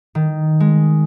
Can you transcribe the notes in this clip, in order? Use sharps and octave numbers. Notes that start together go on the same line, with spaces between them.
D#3
G#3